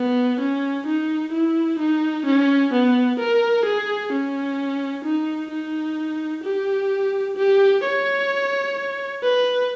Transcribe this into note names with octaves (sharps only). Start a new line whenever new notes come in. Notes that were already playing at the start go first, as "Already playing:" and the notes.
Already playing: B3
C#4
D#4
E4
D#4
C#4
B3
A#4
G#4
C#4
D#4
D#4
G4
G4
C#5
B4